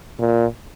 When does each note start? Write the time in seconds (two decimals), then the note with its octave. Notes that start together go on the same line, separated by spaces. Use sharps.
0.19 A#2